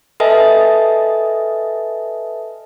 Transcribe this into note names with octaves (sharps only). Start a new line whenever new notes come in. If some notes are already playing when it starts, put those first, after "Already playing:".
A4 B4 D#5 E5 G#5 A5